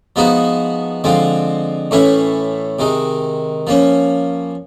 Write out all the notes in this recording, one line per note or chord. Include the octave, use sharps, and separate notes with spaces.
F3 G#3 B3 D#4 F#4
D3 F3 G#3 C4
A2 E3 A3 C#4 E4
C3 D#3 G#3
F3 A#3 C#4